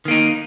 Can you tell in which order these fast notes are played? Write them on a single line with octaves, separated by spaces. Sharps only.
D#3 A#3 D#4